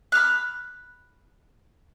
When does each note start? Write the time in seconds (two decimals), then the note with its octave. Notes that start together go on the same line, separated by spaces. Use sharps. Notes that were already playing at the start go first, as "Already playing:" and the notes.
0.12 B5 D6 F6 F#6